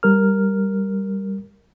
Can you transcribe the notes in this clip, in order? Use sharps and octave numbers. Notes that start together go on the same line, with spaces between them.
G3 A#4 F6